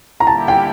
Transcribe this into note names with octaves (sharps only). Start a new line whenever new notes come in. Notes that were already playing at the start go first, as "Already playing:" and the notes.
A#5
D3 G3 A#3 E4 G4 A5
G5